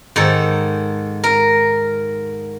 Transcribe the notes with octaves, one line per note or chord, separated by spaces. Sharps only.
G#2 D#3 A4
A#4